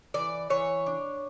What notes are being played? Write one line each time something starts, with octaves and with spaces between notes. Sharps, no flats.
E3 D5
E3 C#5
D4